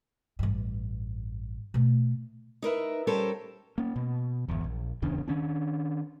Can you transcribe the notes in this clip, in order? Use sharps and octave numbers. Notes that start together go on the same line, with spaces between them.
A1 G2
B2 A3
D#4 A#4 B4 E5
G3 C#4 G4 A4 A#4 C5
A#3 C#4
B2
G1 E2
A#1
D1 E2 C#3 D4
D#3 C#4 D4